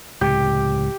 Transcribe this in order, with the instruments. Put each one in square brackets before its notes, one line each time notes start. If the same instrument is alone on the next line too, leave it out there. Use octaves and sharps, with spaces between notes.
[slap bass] C#2 A2 C3 [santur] G4